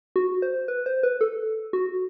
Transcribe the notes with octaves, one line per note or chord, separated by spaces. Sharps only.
F#4
C5
B4
C5
B4
A4
F#4